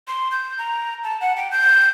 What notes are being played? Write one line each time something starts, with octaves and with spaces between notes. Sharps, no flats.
C6
G6
A#5
A5
F#5
G5
G6